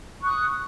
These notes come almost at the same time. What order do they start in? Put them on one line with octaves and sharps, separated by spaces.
C#6 F#6 D#6